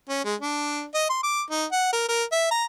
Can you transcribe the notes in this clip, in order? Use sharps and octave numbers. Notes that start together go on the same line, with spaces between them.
C#4
G#3
D4
D#5
C6
D6
D#4
F#5
A#4
A#4
E5
A#5